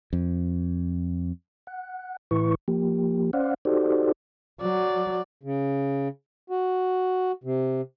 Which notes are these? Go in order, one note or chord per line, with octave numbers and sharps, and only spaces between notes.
F2
F#5
A2 E3 E4 B4 C#6
F3 A#3 G4
C#4 C5 D5 F5 F#5
D#4 F#4 G4 A4 C5 D5
F#3 D5
C#3
F#4
C3